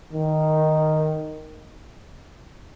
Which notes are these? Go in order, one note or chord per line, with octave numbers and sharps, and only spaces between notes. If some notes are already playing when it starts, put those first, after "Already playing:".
D#3